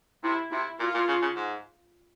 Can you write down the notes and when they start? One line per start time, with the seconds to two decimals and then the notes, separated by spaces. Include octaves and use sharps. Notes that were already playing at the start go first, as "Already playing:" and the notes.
0.24 C3 E4
0.52 C3 E4
0.80 A#2 F4
0.94 A#2
1.08 C#3
1.22 C#3
1.36 G#2